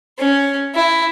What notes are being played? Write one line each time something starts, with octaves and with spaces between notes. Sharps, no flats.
C#4
E4